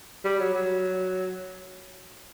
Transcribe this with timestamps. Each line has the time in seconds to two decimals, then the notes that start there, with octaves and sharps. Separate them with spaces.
0.25 G3
0.39 F#3
0.55 F#3